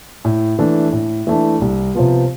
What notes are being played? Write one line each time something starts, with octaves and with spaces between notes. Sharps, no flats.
A2
E3 A3 D4
A2
E3 A3 D4
C2
C3 F3 B3